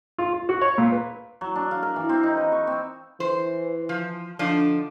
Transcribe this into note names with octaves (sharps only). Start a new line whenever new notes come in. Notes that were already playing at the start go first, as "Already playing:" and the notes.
F4
F4
F#4
C#5
A#2
B4
F#3
D4
F5
A#4
E3
C4
D#4
B4
C#6
C4
E3 C5
F3
D3 F3 D4 D#4